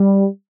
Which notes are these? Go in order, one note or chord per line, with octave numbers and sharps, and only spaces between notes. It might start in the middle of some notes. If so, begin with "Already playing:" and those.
Already playing: G3